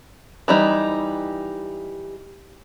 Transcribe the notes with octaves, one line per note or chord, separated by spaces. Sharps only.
E3 G3 D#4